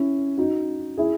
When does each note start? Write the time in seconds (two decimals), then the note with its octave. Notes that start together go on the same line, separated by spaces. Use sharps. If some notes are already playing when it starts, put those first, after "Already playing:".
Already playing: C#4 E4
0.37 D#4 F#4
0.97 E4 G#4